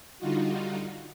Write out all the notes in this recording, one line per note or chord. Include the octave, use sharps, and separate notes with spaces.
D3 G3 D#4 F4 F#4